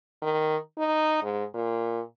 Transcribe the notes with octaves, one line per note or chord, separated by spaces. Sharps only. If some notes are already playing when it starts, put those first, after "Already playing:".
D#3
D#4
G#2
A#2